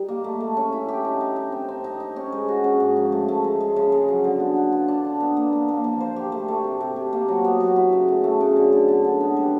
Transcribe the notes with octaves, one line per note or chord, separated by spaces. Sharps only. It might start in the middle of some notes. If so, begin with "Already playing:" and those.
Already playing: G3 D#4
A#3
A3
A3
C#4
E4
G4
D#4
D#4
D#4
C4
C4
D#4
D#4
C#4
G#3
F#4
C#4
G#2
F3
A3
A3
G#3
G#3
C#3
G#3
F#3
D3
B3
B3
F4
D4
D4
B3
A#3
A#3
A#3
F3
C5
G4
A3
A3
C3
C3
C3
A#3
F#3
B3
F#3
E4
C#3
A3
A3
C#3
D3
D3
D3
D3
B3
G3